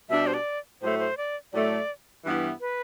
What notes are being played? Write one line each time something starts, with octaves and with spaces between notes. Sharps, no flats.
B2 G3 D4 G4 E5
C5
D5
A2 F#3 A3 C5
C5
D5
A2 F#3 A3 D5
G2 E3 B3 E4 G4
B4